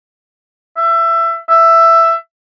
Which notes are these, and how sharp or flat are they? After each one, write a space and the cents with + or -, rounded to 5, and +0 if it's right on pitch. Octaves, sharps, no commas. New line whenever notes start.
E5 +20
E5 +10